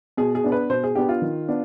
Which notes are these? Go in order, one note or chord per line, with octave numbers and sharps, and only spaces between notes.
B2 G#4
G#4
B3 D4
B4
B2 C5
G#4
B3 D4 G4
F4
D#3
B3 D4